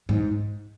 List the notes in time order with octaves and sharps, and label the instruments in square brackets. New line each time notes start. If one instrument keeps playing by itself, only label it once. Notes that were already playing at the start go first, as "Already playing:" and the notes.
[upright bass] G#2